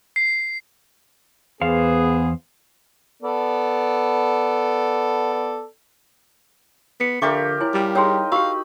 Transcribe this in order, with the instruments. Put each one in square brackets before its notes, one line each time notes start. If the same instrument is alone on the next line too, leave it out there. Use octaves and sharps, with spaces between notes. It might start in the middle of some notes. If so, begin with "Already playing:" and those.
[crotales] C7
[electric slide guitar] E2 C5 F5 [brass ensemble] B3 G#4
[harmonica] B3 A4 D5
[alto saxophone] B3 [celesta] B6 C#7
[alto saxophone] D3 [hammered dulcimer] F3 G4 A#4 [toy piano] E5 C#6 D6
[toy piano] E4 G#5 [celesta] C#5
[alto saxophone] G3
[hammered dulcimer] D#4 [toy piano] G#4 E6 [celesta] C#5 G5 C6
[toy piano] F#4 G4 [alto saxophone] F5 [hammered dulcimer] B5 [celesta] C#6 E6